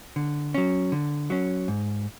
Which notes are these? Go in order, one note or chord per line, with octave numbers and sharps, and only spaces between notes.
D3
F#3 C#4
D3
F#3 C#4
G#2